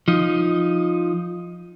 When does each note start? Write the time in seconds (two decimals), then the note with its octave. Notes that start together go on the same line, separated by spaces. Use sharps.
0.08 F3 D#4